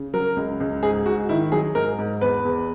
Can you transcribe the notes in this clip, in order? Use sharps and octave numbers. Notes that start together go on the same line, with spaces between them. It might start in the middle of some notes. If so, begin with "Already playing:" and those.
Already playing: C#3
F#3 A#4
C#2
C#2
G#2 G#4
G#2 F#4
D#3 E4
F#3 G#4
G#2 A#4
G#2
E2 B4
E2